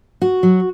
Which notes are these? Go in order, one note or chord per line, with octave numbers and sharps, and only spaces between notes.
F#4
F#3